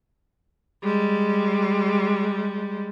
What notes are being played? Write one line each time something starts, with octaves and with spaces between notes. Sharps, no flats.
G3 G#3